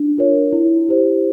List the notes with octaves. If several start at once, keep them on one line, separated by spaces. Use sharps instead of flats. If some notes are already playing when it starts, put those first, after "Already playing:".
Already playing: D4
F4 A#4 C#5
E4
G4 C5